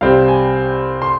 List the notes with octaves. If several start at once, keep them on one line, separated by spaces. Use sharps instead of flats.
C2 C3 G3 C4 F5
G#5
C6